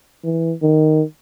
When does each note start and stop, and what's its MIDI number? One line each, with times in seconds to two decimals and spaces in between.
0.24 0.54 52
0.62 1.03 51